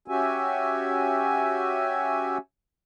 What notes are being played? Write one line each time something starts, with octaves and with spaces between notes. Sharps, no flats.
C#4 F#4 G4 E5 G#5